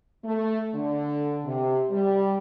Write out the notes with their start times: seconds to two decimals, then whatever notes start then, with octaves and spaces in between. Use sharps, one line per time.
0.24 A3
0.74 D3
1.45 C3
1.90 G3